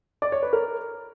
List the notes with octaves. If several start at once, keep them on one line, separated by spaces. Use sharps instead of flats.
D5
C#5
B4
A#4